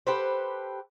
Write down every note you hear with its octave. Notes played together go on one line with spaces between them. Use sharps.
G4 A4 B4 C5